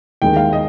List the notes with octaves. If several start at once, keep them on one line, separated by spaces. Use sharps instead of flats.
D#2 D#3 G#3 G5
F5
D#5